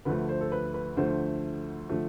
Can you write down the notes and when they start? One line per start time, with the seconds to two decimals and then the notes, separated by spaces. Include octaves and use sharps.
0.05 D2 D3 F3 A3 B4
0.29 C5
0.41 A4
0.52 B4
0.74 B4
0.97 D2 D3 F3 A3 C5
1.89 D3 F3 A3